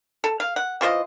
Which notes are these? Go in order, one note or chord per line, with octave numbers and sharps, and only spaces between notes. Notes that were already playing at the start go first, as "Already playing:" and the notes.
A4
F5
F#5
E3 F4 C5 D#5